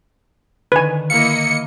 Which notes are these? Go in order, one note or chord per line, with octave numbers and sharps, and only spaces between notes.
D3 D#3 B4 G#5
A#3 E4 D#5 F5 B5 C#7